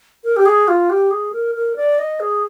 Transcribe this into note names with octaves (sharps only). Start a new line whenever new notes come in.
A#4
G4
G#4
F4
G4
G#4
A#4
A#4
D5
D#5
G#4